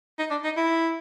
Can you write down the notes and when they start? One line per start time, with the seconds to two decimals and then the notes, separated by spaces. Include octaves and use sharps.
0.19 D#4
0.31 D4
0.44 D#4
0.57 E4